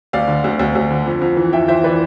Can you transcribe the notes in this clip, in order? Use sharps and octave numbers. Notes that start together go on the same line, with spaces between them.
D2 D5 F5
D3
D2
D2
D2
D3
F2
F2
E3
F2 E5 G5
E3 C5 E5
E3 B4 D5